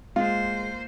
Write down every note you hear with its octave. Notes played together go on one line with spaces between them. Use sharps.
G#3 A#3 F4 C5